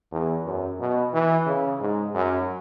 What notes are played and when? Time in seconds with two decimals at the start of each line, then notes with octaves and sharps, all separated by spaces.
0.12 E2
0.45 F#2
0.79 B2
1.13 E3
1.47 C#3
1.81 G#2
2.15 F#2